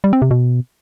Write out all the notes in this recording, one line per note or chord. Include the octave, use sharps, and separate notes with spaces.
G3
C4
C3
B2